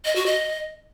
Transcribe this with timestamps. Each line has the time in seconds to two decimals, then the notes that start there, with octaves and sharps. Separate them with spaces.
0.05 D#5
0.16 F#4
0.26 D#5